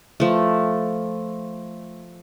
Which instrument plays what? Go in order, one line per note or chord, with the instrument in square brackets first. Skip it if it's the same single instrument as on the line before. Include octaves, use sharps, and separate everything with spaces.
[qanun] F3 A3